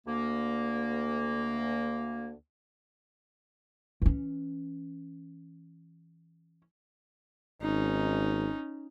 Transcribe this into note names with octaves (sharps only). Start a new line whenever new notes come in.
D2 A#3
E3 C#4
G#1 C#4 D#4